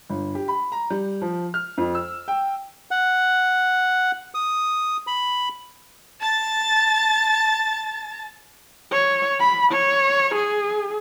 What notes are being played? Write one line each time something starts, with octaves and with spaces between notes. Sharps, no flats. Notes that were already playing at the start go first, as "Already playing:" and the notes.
G1
G4
B5
A#5
G3
F3
F6
F2
E6
G5
F#5
D#6
B5
A5 A6
C#5
B5
C#5
G#4